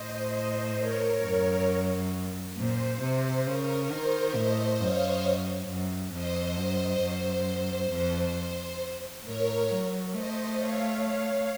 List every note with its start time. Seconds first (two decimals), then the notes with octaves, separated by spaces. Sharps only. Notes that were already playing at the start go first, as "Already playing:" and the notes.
Already playing: A2 C5 D#5
0.79 A#4 C#5
1.24 F#2
2.58 A#2 C5
3.02 C3
3.47 C#3 A#4
3.91 D#3 C5
4.35 A2 C5 D#5
4.80 F#2 C#5 F5
5.68 F#2
6.13 F2 C5 D#5
6.57 F#2 C5 D#5
7.03 F#2 C5
7.91 F2 C5
9.24 A2 A#4 C#5
9.69 F#3
10.14 A3 C5 D#5
10.58 C#5 F5